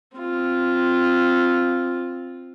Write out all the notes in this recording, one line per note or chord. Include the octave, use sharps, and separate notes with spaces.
C4 F4